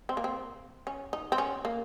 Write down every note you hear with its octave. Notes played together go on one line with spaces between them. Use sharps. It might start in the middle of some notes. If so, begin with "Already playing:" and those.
C4
A#3
C4
C#4
D#4
C4
C#4
A#3